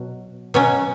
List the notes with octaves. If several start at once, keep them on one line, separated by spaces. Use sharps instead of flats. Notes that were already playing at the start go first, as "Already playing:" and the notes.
Already playing: B2 F#3
B2 F#3 C#4